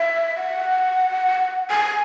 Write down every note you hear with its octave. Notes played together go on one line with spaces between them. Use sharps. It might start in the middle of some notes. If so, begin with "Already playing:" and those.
Already playing: E5
F#5
G#5